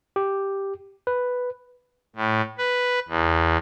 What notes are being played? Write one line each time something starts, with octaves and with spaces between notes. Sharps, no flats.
G4
B4
A2
B4
E2